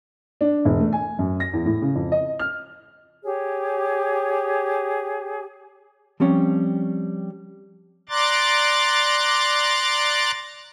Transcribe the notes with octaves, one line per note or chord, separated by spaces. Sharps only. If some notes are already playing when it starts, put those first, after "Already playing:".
D4
E1
A3
G#5
F#2
A#6
E2
A2
C#3
F2
D#5
F6
G4 G#4 C#5
F3 G3 C4 C#4
D5 A#5 C6 D6 F#6 A6